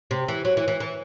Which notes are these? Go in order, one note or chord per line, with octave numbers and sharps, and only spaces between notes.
C3
E3
F#3
E3
E3
E3